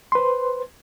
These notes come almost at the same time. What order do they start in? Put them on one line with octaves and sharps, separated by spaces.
C6 B4 C5